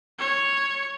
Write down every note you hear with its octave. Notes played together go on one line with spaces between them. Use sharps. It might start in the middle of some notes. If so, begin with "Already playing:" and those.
C#5